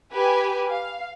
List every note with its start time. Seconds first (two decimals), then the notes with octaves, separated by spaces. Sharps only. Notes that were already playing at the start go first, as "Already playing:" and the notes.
0.13 G4 B4 G#5
0.69 F5